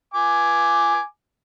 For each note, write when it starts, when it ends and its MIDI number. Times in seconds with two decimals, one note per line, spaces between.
0.14 1.03 80
0.14 1.03 86